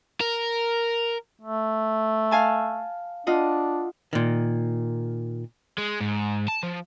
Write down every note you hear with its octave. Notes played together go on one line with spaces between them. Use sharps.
A#4
A3
F5 G#5 A5
D4 F4 D#5 F#5
A#2 D#3
G#3
G#2
A5
F3